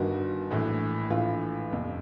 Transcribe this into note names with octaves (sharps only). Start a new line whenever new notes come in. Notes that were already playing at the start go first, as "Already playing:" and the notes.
Already playing: G1 G2 D#3 F#4
A#1 A2 E3
A#1 A2 E3 F4
G1 F2 C3